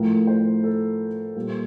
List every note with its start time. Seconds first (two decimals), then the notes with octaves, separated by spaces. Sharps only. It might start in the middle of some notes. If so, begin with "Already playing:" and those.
Already playing: A2 F3 A3 A#4
0.27 C5
0.64 A4
1.36 A#2 G3 A#3